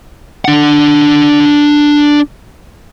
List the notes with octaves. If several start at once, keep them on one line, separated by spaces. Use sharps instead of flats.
D4 F#5